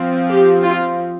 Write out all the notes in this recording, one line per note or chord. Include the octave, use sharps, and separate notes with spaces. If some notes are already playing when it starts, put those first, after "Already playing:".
Already playing: F3 C4
G4
F4